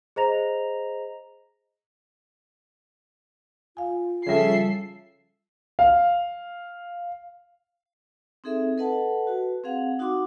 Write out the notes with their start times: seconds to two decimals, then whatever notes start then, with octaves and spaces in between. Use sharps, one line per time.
0.16 G#4 C5 D#5 A#5 A#6 F7
3.77 F4 F5 G#5
4.27 C#3 F3 G3 A4 E5 C7
5.79 F5
8.44 C4 D#4 G#4 A4 E5
8.78 A4 B4 D#5 F#5 A5
9.27 F#4 B4
9.64 C4 G#4 F5 F#5
9.99 D#4 F#4 F#5 C6 D6